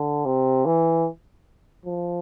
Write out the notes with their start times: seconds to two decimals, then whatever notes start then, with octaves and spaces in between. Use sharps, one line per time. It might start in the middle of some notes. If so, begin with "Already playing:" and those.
Already playing: D3
0.25 C3
0.65 E3
1.86 F3